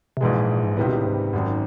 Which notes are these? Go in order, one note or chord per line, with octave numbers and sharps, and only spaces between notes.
C3
A#1 G#2 B2 E3 G#3
A#2
A#2
G#2
C#2 A2 C3 D#3 G3 B3
B2
A2
G#2
G#1 F#2 D#3